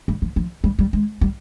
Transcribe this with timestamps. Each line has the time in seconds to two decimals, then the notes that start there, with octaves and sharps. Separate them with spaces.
0.08 G3
0.22 F3
0.36 F3
0.64 G3
0.79 G3
0.93 G#3
1.21 G3